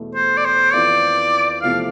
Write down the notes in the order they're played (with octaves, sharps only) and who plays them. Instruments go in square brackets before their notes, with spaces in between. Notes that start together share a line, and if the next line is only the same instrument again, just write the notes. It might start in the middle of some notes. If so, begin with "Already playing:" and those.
Already playing: [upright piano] E2 B2 A3
[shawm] C5
D5
C5
[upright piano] F2 E3 B3 F4 [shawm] D5
[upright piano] E2 C3 F3 A3 E4 [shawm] F5